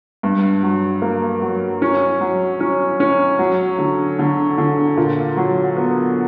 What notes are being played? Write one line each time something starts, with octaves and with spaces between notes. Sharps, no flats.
G2
F#3
A#3
F#3
C#4
F#3
C#4
C#4
F#3
D3
D3
D3
A#2
F#3
B3